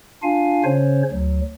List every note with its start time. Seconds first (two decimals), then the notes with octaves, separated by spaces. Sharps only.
0.23 D4 F4 F5 G#5
0.64 C#3 C#4 C5 C#5
1.12 D2 F#3